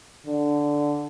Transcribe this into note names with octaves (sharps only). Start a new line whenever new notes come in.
D3